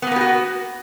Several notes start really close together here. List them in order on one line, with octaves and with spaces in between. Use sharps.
B3 A#3 B4 G4 F#4